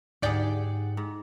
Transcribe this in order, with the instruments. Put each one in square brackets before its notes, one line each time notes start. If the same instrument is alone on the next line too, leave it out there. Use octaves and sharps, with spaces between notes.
[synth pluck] D2 D5 G5 [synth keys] G#2 F#5 [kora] G4 G#4
[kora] G#2